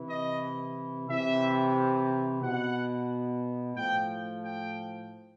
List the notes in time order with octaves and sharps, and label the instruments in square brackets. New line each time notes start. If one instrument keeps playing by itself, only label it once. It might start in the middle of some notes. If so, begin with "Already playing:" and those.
Already playing: [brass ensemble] C3 E3
D#5
C3 E3 E5
B2 F#5
A2 F3 G5
G5